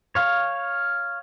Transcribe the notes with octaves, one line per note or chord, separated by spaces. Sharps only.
C#5 F5